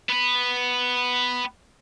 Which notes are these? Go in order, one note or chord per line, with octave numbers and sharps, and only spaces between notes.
B3 B4